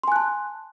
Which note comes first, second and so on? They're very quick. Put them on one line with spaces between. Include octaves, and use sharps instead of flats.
C6 G#5 F#6 A5